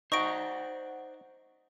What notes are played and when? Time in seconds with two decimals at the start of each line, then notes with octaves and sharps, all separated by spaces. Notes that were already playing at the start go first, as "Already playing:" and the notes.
0.12 D#4 C5 D5 F#5 C#6 A#6 D7